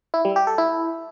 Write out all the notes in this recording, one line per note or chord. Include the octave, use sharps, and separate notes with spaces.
E4
G3
G4
A4
E4